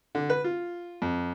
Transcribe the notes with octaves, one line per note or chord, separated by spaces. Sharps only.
D3
B4
F4
F2